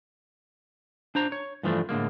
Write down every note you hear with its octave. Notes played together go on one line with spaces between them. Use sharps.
D4 C5 A#5
C#5
G2 E3 F3 A3 D4
A2 D3 G#3 A#3